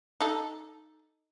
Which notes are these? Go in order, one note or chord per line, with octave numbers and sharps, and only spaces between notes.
D#4 A4